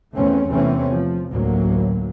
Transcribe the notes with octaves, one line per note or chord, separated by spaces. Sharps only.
E2 A3 C4 C#4
E2 C3 E3 A3 C4 C#4
F3
A1 D2 A2 F#3 A#3